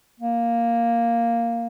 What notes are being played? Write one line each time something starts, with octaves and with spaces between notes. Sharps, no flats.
A#3